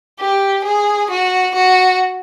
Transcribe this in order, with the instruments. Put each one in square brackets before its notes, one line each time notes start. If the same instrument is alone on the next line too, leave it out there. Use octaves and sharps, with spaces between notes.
[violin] G4
G#4
F#4
F#4